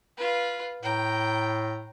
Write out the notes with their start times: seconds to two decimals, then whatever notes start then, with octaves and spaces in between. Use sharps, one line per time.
0.17 F4 B4
0.83 A2 G5 A#5